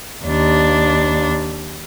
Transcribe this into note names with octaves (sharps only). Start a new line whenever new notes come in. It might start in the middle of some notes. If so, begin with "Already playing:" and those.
D#2 D4